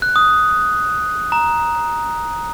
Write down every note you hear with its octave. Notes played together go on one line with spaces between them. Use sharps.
F#6
D#6
A#5